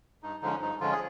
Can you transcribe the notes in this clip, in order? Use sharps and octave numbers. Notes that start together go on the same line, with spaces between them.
G2 D#4
D3 F3 G#3 C#4 D#4
G2 D#4
D3 F3 G#3 C#4 F4
G#4